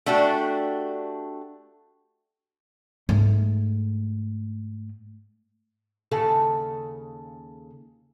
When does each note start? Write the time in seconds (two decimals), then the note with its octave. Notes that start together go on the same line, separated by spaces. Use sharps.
0.06 A3 D4 F#4 G4
3.09 G#2 A3
6.11 D#2 C#3 A4